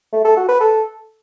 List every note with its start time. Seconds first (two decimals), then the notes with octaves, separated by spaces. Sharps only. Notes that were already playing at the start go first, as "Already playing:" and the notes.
0.13 A3
0.25 A4
0.37 F#4
0.48 B4
0.60 A4